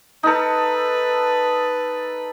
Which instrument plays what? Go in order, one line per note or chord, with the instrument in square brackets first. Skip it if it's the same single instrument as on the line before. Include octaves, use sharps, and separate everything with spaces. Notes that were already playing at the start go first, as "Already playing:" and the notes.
[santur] D#4 A4 [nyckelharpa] B4